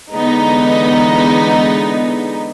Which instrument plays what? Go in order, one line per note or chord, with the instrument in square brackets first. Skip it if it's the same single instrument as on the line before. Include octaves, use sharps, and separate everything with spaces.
[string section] D3 E3 G#3 B3 D#4